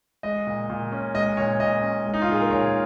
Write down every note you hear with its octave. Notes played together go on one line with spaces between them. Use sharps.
G#3 D#5
A#2
A#2
C#4
G#3 D#5
A#2 C#5
A#2 D#5
C#4
G#3
D#4
F4
A#2 G#4
A#4
A#2 C#5